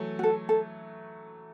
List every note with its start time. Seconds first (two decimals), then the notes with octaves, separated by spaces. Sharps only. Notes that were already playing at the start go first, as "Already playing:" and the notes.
Already playing: E3 F#3 A3
0.19 F#4 A4
0.49 A4